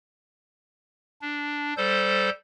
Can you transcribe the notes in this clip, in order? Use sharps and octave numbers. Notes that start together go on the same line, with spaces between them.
D4
G3 A4 C5 G6